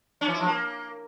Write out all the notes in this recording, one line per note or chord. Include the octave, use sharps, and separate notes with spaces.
C#4
E3
E4
F3
A#3